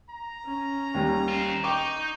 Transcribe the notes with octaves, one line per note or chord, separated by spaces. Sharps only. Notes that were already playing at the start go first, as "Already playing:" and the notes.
A#5
C#4
D#2 G3
C4 F4
D#4 D#5 G5 C#6 D6 G6